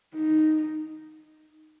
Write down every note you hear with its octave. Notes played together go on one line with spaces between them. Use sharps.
D#4